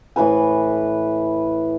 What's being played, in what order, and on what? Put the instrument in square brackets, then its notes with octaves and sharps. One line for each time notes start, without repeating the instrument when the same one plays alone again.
[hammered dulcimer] A2 E3 B4 G#5